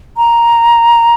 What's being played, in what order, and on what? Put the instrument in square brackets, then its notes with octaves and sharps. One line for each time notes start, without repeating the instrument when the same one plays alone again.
[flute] A#5